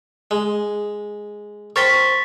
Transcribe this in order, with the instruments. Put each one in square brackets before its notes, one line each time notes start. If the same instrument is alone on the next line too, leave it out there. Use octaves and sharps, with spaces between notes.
[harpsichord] G#3
[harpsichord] A#4 C5 G5 [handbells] C#6 A6 B6